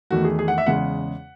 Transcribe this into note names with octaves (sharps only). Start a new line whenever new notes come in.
E2 D#3 A3 F#4
G#4
G#4
F#5
E5
E2 C#3 G#3 F#5